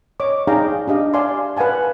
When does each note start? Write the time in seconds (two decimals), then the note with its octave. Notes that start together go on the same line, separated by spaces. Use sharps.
0.20 C#5 D#5 D6
0.47 D#4 G#4 D5 F5 G5 A#5
0.88 D4 G4 D#5 F5
1.14 D5 E5 F5 G#5 A5 C6
1.57 B4 F5 F#5 G#5 A5